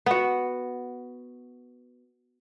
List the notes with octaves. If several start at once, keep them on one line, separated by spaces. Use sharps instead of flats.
B3 F#4